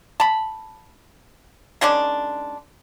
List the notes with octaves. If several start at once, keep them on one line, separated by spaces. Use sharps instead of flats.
A5 B5
D#3 G#3 C#4 D4